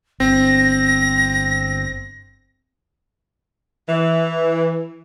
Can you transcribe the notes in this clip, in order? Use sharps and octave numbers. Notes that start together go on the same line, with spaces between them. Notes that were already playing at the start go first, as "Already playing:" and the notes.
G1 C4 A#6
E3